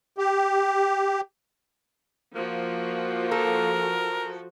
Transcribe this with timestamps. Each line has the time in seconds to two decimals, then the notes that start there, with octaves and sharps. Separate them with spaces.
0.18 G4
2.36 F3 A#3 F#4
3.31 A4 A#4